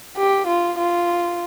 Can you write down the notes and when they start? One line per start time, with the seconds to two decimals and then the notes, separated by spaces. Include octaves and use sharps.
0.17 G4
0.48 F4
0.79 F4